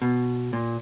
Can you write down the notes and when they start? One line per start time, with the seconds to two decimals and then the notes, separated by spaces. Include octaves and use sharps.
0.02 B2
0.53 A#2